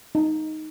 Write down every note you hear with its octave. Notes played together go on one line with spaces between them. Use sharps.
D#4